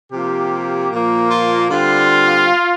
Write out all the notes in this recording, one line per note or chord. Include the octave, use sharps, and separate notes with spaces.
C3 F3 A#3 G4
A#2 F3 A#3
F4
D3 G3 C4 F4